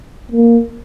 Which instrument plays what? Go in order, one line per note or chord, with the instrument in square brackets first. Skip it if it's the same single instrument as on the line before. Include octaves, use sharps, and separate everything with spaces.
[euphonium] A#3